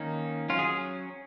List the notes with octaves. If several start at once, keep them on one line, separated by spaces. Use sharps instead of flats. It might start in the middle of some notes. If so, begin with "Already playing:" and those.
Already playing: D#3 A#3 C#4 D#4
F#3 C#4 F4
G#4